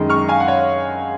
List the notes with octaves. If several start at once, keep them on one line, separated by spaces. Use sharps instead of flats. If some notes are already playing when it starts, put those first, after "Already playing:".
Already playing: F#2 D#3 G#3
C#6 F6
F5 G#5
F#5
C#5 F5